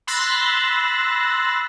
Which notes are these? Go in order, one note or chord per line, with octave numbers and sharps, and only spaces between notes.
B5 C6 E6 F#6 A6 A#6